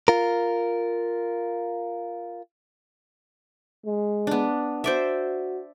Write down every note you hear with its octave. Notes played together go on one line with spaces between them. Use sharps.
F4 A#4
G#3
B3 D4
F#4 C5 D5 E5